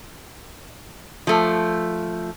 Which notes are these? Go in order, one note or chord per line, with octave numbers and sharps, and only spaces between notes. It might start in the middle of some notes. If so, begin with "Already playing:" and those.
F3 A3